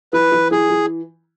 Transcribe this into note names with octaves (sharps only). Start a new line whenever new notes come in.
E3 B4
E3
E3 G#4
E3